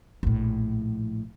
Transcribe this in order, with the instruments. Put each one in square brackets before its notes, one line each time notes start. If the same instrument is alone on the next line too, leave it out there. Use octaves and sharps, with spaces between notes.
[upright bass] A#1 A2